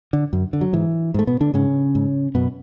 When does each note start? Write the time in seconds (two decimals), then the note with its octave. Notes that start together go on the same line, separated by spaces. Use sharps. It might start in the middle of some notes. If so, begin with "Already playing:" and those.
0.13 D3
0.33 F#2
0.53 D3
0.61 F#3
0.73 G#2 E3
1.14 G#2 A3
1.27 B2 B3
1.41 D3 D4
1.54 G#2 C#3 C#4
1.95 G#2
2.35 F#2 B2 B3